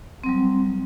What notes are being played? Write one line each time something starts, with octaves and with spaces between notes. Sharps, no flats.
F#3 G3 C4